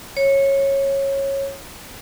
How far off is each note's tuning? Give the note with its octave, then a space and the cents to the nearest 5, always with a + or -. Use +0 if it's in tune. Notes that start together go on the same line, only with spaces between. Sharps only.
C#5 -15